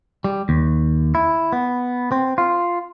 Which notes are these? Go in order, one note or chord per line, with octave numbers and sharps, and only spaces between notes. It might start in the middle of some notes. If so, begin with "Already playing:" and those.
G3
D#2
E4
B3
C4
F4